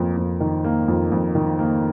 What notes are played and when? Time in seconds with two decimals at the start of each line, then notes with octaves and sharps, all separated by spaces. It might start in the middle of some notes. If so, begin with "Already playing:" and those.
Already playing: F2 A#3
0.17 F2
0.40 D#3
0.64 A#3
0.88 F2
1.12 F2
1.35 D#3
1.59 A#3